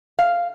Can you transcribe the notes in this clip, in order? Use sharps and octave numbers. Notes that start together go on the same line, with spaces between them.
F5